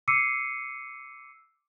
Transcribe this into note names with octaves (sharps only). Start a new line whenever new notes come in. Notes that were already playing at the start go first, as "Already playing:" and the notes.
D6 E6 C7 C#7 D#7